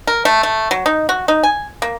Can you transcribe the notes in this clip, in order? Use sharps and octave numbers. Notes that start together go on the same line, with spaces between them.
A#4
A3
A3
F#3
D#4
F#4
D#4
G#5
A#3